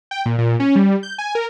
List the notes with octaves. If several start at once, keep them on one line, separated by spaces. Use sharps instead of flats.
G5
A#2
A#2
C#4
G3
G6
G#5
A#4